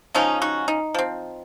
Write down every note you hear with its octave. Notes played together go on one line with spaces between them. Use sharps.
C#3 F3 G#3 C#4 D#4
D#4 F#4
D#4
F3 C4